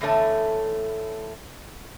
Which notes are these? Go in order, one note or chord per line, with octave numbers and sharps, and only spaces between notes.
E2 A2 D3 A3 C#5 A5